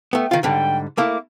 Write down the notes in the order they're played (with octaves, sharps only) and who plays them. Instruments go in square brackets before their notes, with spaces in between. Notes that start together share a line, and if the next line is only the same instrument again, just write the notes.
[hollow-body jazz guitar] A3 B3 [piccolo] G5
[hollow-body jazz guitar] D#3 F4
[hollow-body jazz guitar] G#2 D3 G3 [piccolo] G5
[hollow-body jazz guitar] A3 A#3 E4 [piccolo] D6